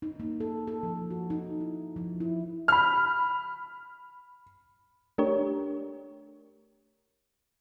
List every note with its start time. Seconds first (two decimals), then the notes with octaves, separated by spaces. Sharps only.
0.02 D#4
0.20 A#3
0.40 A4
0.67 A4
0.83 F3
1.10 F#4
1.30 D#4
1.61 E4
1.96 F3
2.20 E4
2.68 B5 F6
5.18 A3 D4 G4 A#4 C#5